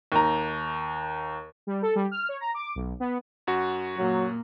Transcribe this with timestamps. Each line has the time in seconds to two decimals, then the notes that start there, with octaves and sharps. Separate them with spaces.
0.12 D#2 A#5
1.67 G3
1.82 A4
1.95 G3
2.11 F6
2.29 C#5
2.40 A#5
2.54 D6
2.76 B1
3.00 B3
3.47 F#2 F#4
3.98 A#2 F#3 A#3